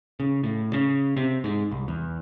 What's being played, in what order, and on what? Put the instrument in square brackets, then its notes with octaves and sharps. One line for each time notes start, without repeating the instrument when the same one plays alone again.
[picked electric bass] C#3
A2
C#3
C3
G#2
C2
E2